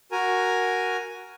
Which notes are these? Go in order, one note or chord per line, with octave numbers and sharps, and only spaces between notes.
F#4 A#4 G#5 A#5